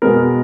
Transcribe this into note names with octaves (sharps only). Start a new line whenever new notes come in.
B2 G#3 B3 A#4